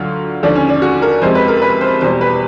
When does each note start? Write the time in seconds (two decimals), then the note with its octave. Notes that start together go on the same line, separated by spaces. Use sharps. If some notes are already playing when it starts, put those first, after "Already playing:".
Already playing: D2 D3 F#3 F4
0.43 D#2 D3 F3 D4
0.55 C#4
0.69 D4
0.82 F#4
1.02 A#4
1.22 F2 C3 F3 G#3 C5
1.35 B4
1.48 A#4
1.62 B4
1.81 C5
2.01 E2 B2 G3 C5
2.21 B4